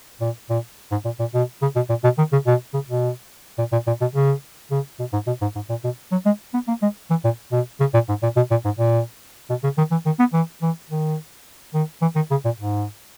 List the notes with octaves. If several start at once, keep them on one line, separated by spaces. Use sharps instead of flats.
A#2
A#2
G#2
A#2
A#2
B2
C#3
B2
A#2
B2
D#3
C#3
B2
C#3
B2
A#2
A#2
A#2
B2
C#3
C#3
B2
G#2
B2
G#2
G#2
A#2
B2
F#3
G#3
B3
A#3
G#3
E3
A#2
B2
C#3
A#2
G#2
A#2
B2
A#2
G#2
A#2
B2
C#3
D#3
E3
D#3
B3
E3
E3
D#3
D#3
E3
D#3
C#3
A#2
G#2